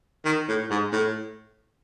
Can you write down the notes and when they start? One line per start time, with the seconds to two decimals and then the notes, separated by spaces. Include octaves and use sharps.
0.25 D#3
0.48 A2
0.71 G#2
0.92 A2